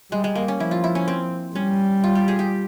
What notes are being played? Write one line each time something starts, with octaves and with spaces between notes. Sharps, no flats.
G3 G#3
G#3
A#3
C#4
F3 E4
F4
E4
C#4
C4
G3 C#4
F4
G4
G#4
G4